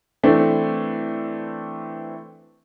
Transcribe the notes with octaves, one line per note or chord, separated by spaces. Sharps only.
E3 A3 C4 D4